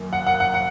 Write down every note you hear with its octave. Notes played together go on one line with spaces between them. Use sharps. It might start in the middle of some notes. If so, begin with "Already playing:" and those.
Already playing: F#2 D#3 A#3
F#5
F#5
F#5
F#5